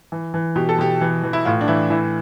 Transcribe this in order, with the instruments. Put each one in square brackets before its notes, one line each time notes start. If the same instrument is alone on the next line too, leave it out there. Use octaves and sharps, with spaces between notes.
[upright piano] E3
E3
B2 G4
A4
B2 G4
E3
E3
E4
A2 F4
D4
E3 E4
E3 E4